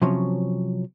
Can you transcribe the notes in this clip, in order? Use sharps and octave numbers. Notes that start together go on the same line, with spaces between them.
C3 F3 F#3 C#4